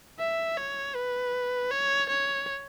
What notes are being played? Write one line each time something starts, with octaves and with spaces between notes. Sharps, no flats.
E5
C#5
B4
C#5
C#5